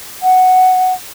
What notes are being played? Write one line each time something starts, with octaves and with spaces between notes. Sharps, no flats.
F#5